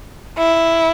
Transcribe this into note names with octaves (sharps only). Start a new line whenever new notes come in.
E4